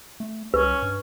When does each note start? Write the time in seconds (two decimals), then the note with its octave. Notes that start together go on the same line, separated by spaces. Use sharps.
0.20 A3
0.54 C2 C#4 B4
0.82 G2